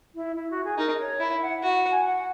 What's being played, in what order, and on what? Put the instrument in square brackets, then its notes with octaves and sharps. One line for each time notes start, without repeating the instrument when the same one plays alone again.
[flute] E4
E4
F#4
G#4
[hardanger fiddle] D#4 [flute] A#4
[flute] D#5
C#5
[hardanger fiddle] E4
[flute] E5
F#5
[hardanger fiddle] F#4
[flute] F#5
G#5
F#5